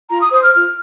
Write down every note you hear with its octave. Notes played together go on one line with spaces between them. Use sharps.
F4 A#5
D#6
C5 D#6
F6
F4 F6